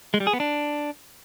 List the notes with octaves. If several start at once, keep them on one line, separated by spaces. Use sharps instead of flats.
G#3
G3
G#4
B3
D4